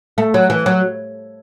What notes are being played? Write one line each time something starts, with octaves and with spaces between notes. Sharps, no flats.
A3
F#3
E3
F#3